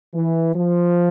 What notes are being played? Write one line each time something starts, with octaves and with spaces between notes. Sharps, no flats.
E3
F3